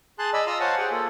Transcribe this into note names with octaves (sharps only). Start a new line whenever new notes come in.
G#4 A5 C6 F#6
D5 D#5 B5 E6
F4 A#5 C6 D#6 E6
C5 C#5 F5 F#5 G#5 A5
G4 G#4 F#5 G5
A#3 F4 A4